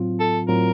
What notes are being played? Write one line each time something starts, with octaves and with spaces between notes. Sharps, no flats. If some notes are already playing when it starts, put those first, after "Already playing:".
Already playing: A2 F#3 C4 F4
A4
A2 F#3 C4 F4 A#4